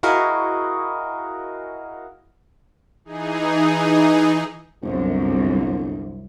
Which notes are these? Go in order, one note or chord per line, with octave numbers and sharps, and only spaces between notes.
E4 F#4 G#4 A#4 D#5 F5
E3 D#4 G#4
G1 C2 F#2